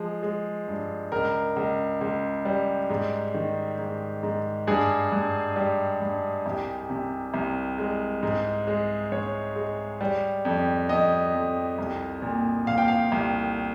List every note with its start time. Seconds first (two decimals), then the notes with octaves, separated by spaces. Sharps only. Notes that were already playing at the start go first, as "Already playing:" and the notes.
Already playing: F3 G#3
0.23 G#3
0.68 G2
1.12 C#2 A#4
1.56 C#2
2.01 C#2
2.45 G3
2.90 G#2
3.34 D#3
3.79 G#2
4.23 G#2
4.67 G2 G#4
5.12 G2
5.56 G3
6.01 G2
6.46 C2 G4
6.90 C3
7.34 C2
7.78 G#3
8.23 G#2
8.67 G#3
9.12 G#2 C#5
9.56 G#3
10.01 G3
10.45 F2
10.89 F2 D#5
11.34 F2
11.78 C2
12.22 A#2
12.67 A#2 F5
12.78 G5
12.88 F5
13.12 C2